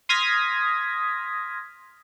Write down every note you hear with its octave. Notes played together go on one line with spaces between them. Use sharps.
C6 D#6 F6 G#6 A#6 B6